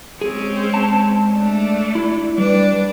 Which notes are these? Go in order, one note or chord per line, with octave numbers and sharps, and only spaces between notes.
G#3 C4 C#4 G#4
A5
A3 D4
E4
G3 D4 B4